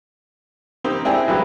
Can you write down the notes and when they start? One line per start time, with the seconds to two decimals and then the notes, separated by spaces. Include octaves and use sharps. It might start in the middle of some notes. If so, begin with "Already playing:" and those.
0.84 A#3 C4 D#4 G4 C5
1.05 G#3 C4 D4 E4 G4 G#4
1.27 A1 E3 F#3 G#3 G4 B4